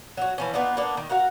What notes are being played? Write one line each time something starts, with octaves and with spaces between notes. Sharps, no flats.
F#3 F#4
E3 F3 C#4
B3 D4 D#4 F4
A#3 B3 D4
D#3
F#4 A#4 F5 F#5